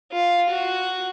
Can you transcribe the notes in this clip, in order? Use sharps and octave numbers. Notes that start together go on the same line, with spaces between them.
F4
F#4